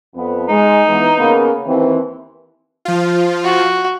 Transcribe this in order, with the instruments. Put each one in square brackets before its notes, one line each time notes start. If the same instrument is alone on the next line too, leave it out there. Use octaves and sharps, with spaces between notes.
[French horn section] F2 B3
[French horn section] G#3 [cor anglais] D#4
[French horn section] E3 B3
C#3 A#3 B3
D#2 E3 C4
[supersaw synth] F3 F4
[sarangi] F#4